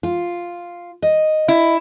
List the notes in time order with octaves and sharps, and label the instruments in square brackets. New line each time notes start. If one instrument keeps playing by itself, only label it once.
[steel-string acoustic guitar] F4
D#5
[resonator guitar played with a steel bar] E4